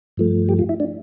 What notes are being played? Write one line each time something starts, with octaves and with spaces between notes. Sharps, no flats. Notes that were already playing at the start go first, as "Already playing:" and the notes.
G2 F3 A3
G4
F4
E4
D4